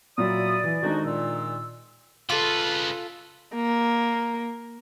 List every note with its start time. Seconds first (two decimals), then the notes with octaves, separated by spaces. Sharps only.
0.18 A#2 F#3 D5 E5 B5 D#6
0.64 E3
0.83 F2 D#3 G#3 D4 D#4 F#4
1.05 A#2 E6
2.30 C#3 F4 A4 B4
3.55 A#3